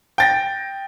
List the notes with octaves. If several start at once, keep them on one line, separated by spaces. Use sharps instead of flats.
G5 A6 A#6